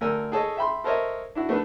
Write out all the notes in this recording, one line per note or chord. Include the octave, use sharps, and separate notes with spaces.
D2 A#4 G#5 E6
G#4 A4 C#5 D#5
E5 G5 B5 C6
A4 A#4 C5 C#5 D#5 E5
D4 E4 F#4
A3 B3 D4 A4 B4